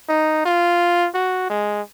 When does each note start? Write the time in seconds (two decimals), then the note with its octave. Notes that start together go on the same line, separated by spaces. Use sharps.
0.09 D#4
0.45 F4
1.14 F#4
1.50 G#3